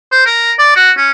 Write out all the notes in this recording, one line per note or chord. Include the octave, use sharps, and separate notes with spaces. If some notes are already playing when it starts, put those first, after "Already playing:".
C5
A#4
D5
F#4
C#4